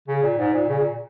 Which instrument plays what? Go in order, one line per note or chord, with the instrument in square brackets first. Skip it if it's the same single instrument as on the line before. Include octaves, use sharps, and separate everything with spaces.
[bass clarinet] C#3
A#2
G#2
A#2
C#3
A#2